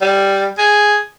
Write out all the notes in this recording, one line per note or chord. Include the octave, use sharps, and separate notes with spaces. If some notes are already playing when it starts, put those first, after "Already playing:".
G3
G#4